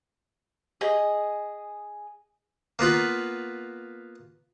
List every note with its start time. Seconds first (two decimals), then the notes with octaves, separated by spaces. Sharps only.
0.81 G#4 D#5 G#5
2.79 A#3 B3 F4 B4